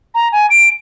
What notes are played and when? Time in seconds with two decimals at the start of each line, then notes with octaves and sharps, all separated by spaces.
0.15 A#5
0.32 G#5
0.50 D7